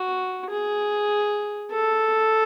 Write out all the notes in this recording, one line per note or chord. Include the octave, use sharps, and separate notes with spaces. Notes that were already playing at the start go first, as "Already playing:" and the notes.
Already playing: F#4
G#4
A4